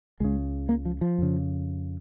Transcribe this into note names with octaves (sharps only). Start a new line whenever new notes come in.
C#2 C#3 G#3
A#3
F3
F3
F2 C#3